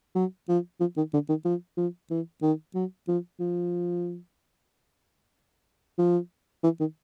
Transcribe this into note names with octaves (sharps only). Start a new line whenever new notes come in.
F#3
F3
F3
D#3
D3
D#3
F3
F3
E3
D#3
F#3
F3
F3
F3
E3
D#3